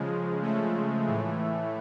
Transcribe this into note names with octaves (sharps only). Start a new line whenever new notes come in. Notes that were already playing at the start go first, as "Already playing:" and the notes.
Already playing: C#3 F3 G#3
A3
A2 E3